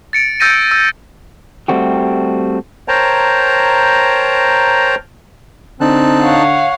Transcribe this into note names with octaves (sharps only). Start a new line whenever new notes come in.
A6 C#7 D7
E6 G6 A6 A#6 D#7
E6
G3 A3 C4 F#4 G4
A#4 C5 C#5 G5 A5 A#5
D3 C4 D#4 A5 F#6
C#5 F5 F#5